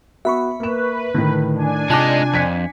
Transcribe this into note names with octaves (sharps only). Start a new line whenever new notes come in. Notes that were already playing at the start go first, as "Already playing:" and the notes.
B3 F#4 E5 B5 C#6
A#3 B4 E7
A2 D3 D#3
D4 G#5
C3 G#3 D#4 F4 A5 D6 F#6
F2 G#6 B6 C#7